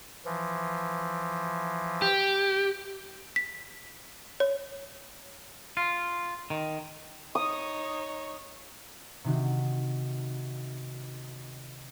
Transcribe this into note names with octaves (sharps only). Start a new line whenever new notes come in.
E3 F3
G4
B6
C#5
F4
D#3
D#4 C#5 D#6
C3 D#3 F#4